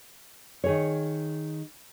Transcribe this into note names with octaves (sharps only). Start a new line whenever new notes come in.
D#3 G#4 C#5